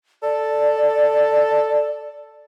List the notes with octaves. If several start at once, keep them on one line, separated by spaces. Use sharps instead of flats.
A4 D5